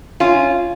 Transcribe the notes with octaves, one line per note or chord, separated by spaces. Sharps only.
C#4 F4